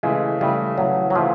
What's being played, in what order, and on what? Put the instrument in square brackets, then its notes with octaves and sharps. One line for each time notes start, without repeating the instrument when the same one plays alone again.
[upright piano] C#3 E3 A3 [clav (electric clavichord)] G#3
[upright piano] C#3 E3 A3 [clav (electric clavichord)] G3
[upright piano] C#3 E3 A3 [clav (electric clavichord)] F#3
[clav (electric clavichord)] F#3
[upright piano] C#3 E3 A3 [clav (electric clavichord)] F3